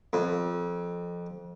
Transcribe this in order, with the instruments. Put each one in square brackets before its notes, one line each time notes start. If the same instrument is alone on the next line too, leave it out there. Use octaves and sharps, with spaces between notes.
[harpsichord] F2